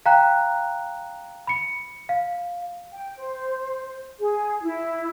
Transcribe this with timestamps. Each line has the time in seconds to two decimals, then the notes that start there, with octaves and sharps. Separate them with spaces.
0.06 F5 G5 A#5 F#6
1.47 B5 C#7
2.09 F5
2.93 G5
3.17 C5
4.19 G#4
4.63 E4